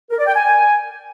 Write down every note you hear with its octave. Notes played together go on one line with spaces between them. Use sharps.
A#4
D5
G5
G#5